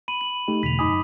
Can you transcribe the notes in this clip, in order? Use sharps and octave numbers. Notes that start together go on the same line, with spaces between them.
B5 D#7 F#7
F#7
A3 D#4 G4
E2 B2 D3 B6 F7
F#2 D#4 G#5 B5 D6 D#6